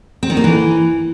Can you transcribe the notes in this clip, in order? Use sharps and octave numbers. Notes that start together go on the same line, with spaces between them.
C4
D#3
A#3
E3